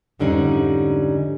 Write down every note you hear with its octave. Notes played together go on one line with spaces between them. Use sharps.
F2 G#2 D3 G3 C#4 D#4